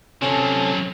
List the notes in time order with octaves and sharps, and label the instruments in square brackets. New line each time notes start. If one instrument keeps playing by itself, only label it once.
[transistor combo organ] C3 A4 [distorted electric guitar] F3 F#3 [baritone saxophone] C#4